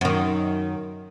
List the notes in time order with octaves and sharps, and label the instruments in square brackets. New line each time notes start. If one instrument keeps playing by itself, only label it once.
[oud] F#2 D#3